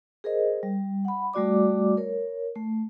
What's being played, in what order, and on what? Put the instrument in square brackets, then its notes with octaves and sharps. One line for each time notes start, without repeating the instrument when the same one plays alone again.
[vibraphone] G#4 A#4 C5 D#5
G3
F#5 B5
G3 A3 F#4 D5 D6
A#4 C#5
A3